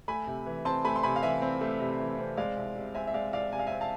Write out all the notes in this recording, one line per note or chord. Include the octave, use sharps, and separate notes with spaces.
A3 G#5 B5
C3
E3
C4 A5 C6
A3 G#5 B5
C6
C3 G#5 B5
F5
E3 E5 G#5
C4
A3
C3
E3
C4
G#3 D5 F5
C2
C3
C4 E5 G#5
E5
G#3 D5 F5
C2 D5 F5
C3 G#5
F5
E5 G#5
C4
F5 A5